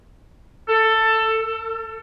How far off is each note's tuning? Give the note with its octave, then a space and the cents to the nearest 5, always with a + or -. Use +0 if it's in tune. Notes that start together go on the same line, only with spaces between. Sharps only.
A4 +15
A4 +45